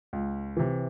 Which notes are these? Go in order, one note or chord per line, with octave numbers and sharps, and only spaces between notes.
C#2
C3 E3